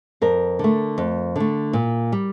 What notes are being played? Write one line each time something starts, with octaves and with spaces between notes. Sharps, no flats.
F2 A#4
D3 A3
F2
D3 A3
A#2
G3